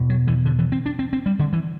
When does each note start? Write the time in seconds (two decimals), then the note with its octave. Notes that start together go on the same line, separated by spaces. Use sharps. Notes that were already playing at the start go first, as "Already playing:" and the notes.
Already playing: E2 B2
0.10 F#3
0.27 E3
0.45 D3
0.59 E3
0.72 C4
0.86 D4
0.99 C4
1.13 C4
1.26 G3
1.39 D3
1.53 E3